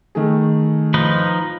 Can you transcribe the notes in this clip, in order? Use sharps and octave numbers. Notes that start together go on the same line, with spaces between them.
D#3 A3 G#4
F3 D#4 B4